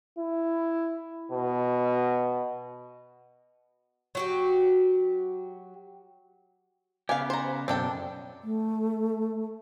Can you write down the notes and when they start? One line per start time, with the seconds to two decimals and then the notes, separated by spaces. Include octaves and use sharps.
0.18 E4
1.31 B2
4.15 F#3 F#4 G4
7.09 C#3 B3 G4 F5 G#5
7.30 C5 A#5
7.68 F#2 B2 C4 D4 A4 G5
8.41 A3